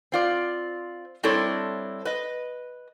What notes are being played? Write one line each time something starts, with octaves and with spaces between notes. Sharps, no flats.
C4 F4 D5
G3 C4 D4 E4 A4 C#5
B4 D#5